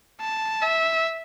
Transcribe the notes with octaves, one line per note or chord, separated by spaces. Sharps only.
A5
E5